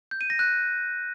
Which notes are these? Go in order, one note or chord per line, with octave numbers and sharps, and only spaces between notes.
G6
D#7
A#6
F#6